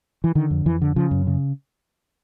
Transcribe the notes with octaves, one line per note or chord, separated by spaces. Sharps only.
E3
D3 D#3
F2
F2 E3
D3
C#3 F3
F#2
C#3